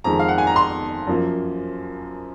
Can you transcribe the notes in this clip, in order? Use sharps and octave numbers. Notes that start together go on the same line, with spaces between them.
F2 D#3 G#3 A#5
F5
F#5
G#5
A#5
C6
F#2 F3 A#3